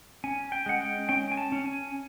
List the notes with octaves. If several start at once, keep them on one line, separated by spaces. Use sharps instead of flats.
C#4 G#5
G5
G#3 F#5
G5
C#4 G5
G#5
A5
C#4
G#5